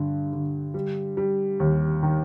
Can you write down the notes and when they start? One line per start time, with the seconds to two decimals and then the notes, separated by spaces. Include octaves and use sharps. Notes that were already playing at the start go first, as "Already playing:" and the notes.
Already playing: G2 D3
0.33 D3
0.74 G3
1.17 G3
1.60 D#2
2.03 D#3